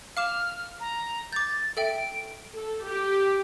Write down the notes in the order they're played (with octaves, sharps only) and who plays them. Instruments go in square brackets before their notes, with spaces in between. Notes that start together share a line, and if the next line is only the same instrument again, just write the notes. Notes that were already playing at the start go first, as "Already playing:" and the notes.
[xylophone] F5 D6 E7 [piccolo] F6
[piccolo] A#5
[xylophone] D6 G6 [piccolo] A6
[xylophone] A4 E5 G5 [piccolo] D7
[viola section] A4
G4